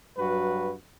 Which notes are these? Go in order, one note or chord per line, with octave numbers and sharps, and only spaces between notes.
G2 F#3 F#4 B4